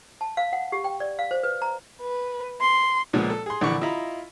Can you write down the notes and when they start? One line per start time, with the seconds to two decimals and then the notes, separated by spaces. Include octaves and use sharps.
0.21 A5
0.37 F5
0.53 F#5
0.72 G4
0.84 G5
1.00 D5
1.19 F5
1.31 C5
1.43 B4
1.62 A#5
2.02 B4
2.61 C6
3.13 C#2 A#2 F3 G#3 A#3 B3
3.30 A4
3.46 G#4 C6
3.61 A#1 D3 E3 D5 B5 C#6
3.81 E4 F4 D#5 A#5 B5